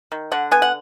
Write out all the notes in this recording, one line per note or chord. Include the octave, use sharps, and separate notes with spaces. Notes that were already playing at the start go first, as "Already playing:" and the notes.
D#3
D3 F#5
B3 G#5
F#5